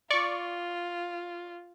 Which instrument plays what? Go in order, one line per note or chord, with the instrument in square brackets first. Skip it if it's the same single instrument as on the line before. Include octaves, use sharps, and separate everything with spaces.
[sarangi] F4 [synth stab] D5 C#6